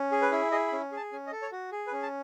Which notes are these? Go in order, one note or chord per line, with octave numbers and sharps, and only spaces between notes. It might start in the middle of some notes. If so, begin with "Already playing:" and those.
Already playing: C#4
G#4
B4
E4
G#4 D#5
B5
C#4
G#4 A5
C#4 G#5
D#5
A4
C#5
F#4
G#4
B4
C#4
A5